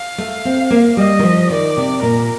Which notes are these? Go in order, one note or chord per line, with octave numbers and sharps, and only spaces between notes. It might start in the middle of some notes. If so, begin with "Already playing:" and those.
Already playing: F5
A3
C4
A#3
G3 D#5
D#3
F3
D#3 D5
C3
A#2 A#4